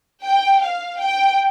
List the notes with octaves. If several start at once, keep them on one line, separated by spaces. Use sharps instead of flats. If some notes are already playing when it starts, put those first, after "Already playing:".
G5
F5
G5